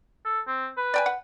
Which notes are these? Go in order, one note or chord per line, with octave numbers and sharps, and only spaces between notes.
A4
C4
B4
D5 G5 G#5
F#5